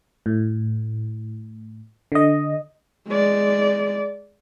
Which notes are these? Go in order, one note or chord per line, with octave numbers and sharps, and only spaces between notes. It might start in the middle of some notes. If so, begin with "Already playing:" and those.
A2
D3 D#5
G#3 D5